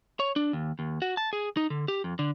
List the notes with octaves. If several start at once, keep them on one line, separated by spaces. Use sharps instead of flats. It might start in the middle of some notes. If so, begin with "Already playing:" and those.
C#5
D4
D#2
D#2
F#4
A5
G#4
D#4
D3
G4
F2
D3